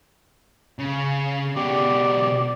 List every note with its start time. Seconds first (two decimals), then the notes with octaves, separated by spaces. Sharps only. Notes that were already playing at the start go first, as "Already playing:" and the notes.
0.79 C#3
1.56 B2 G4 D5